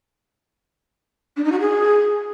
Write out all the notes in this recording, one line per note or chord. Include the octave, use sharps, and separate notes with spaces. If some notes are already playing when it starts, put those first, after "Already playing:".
D4
D#4
F#4
G#4